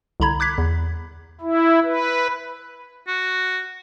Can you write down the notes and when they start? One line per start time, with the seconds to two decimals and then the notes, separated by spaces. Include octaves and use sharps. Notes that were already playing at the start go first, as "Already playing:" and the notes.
0.20 C2 D3 A#5 B5 G#6
0.40 D6 F#6 G#6 B6
0.58 E2
1.41 E4
1.84 B4
3.08 F#4